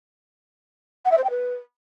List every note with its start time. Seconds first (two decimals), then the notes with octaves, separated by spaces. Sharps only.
1.05 F#5
1.11 E5
1.18 C5
1.24 G5
1.30 B4